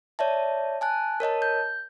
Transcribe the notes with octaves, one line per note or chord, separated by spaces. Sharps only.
C#5 D5 E5 A5
G#5 A5 F#6
A#4 C#5 D#5 A5
G6